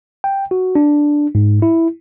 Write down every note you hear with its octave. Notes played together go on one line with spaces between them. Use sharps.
G5
F#4
D4
G#2
E4